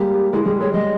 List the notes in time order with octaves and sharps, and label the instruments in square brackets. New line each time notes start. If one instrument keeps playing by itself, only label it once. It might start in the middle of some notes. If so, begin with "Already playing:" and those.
Already playing: [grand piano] G3 G#3 A#3 [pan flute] G4
[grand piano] G#3 [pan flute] E4
[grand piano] G3 [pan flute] G#4
[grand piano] G#3 [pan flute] C#5
[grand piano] G3 [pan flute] D#5